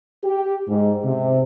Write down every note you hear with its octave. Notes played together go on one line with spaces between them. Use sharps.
G4
G#2
C3